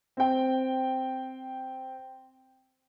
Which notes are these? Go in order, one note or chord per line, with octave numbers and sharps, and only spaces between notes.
C4 G5